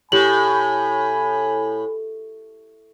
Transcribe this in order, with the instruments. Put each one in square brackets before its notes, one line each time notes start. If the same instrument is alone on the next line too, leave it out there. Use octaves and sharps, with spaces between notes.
[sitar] A2 [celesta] G4 F#7 [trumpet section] G#5 B5